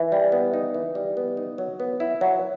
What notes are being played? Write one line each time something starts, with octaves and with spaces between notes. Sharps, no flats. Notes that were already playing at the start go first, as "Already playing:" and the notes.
Already playing: E3
G3
B3
D#4
E3
G3
B3
D#4
F#3
B3
E4
F#3